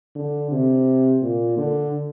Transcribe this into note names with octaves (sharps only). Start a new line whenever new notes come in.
D3
C3
A#2
D3